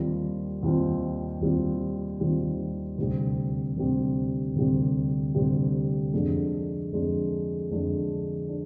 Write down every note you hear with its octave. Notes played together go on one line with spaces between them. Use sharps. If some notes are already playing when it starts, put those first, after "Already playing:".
Already playing: D#2 D#3 G3 C4 F4
D#2 D#3 G3 C4 F4
D#2 D#3 G3 C4 F4
D#2 D#3 G3 C4 F4
D2 C3 G3 C4 G4
D2 C3 G3 C4 G4
D2 C3 G3 C4 G4
D2 C3 G3 C4 G4
F2 D3 G#3 D4
F2 D3 G#3 D4
F2 D3 G#3 D4
D4